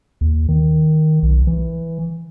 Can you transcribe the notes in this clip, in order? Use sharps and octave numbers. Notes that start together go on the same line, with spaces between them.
D#2
D#3
B1
E3